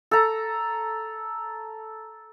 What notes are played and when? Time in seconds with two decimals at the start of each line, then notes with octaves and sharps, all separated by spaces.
0.11 A4 A#5